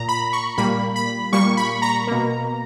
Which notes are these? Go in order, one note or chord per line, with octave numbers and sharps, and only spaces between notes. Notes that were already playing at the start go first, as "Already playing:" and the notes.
Already playing: A#2 A#5
B5
C#6
A#2 G3 A#3 B5
B5
A#2 G3 A#3 C#6
B5
A#5
B2 A#3